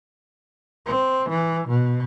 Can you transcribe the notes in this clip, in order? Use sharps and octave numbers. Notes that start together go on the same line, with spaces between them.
C4
E3
B2